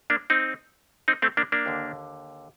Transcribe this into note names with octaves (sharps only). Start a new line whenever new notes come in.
A#3 D4
C4 D#4
C4 D#4
A3 C4
A#3 D4
A#3 D4
D#2 D3